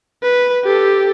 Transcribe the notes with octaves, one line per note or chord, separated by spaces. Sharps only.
B4
G4 A4